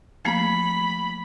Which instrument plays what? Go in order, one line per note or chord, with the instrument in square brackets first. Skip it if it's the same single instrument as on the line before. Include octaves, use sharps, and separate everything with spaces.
[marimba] F3 A3 A#3 [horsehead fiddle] B5